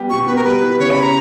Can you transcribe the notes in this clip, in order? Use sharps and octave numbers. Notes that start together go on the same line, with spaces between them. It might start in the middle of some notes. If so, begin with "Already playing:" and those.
Already playing: G3 B3 G4
B2 C#6
B3 B4
A#4
G3 B4
E4
C#3 C#5
B5
C#4
A#5